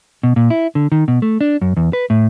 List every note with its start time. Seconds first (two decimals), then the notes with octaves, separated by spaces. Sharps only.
0.23 B2
0.36 A#2
0.50 E4
0.75 D3
0.92 D#3
1.08 B2
1.22 A3
1.41 D4
1.62 F#2
1.77 E2
1.93 B4
2.10 A2